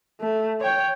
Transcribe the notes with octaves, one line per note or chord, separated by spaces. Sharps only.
A3
C#5 G5